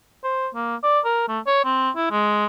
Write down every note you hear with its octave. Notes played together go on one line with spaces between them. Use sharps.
C5
A#3
D5
A#4
A3
C#5
C4
E4
G#3